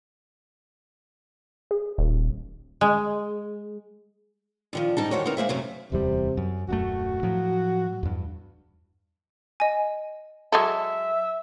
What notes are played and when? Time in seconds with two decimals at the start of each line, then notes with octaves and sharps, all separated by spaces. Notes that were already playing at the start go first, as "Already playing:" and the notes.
1.71 G#4
1.98 D#1
2.81 G#3
4.73 D3 D#3 F3
4.97 G#2 G3 D#4 A5
5.11 E2 D#3 F#4 G4 C5 C#5
5.25 B3 C4 D#4 E4 A#4 C#5
5.37 G#3 A#3 C5 E5
5.49 F#2 C3 F#3 A3 C4
5.92 D1 E2 C3 G3
6.37 F#2
6.68 D#1 F#2 A3 F#4
7.23 A2 F3 F#3
8.03 E2 G2
9.60 D#5 G#5
10.52 F#3 G#3 A4 E5